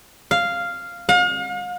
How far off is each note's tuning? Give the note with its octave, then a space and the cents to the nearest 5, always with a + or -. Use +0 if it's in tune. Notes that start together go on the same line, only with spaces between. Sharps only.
F5 -5
F5 +40